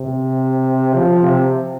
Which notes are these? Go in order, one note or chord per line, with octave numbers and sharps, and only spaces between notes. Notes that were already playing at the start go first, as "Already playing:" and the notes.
Already playing: C3
F3
C3